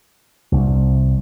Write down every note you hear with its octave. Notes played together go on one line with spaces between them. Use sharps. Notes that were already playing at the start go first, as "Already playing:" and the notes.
C2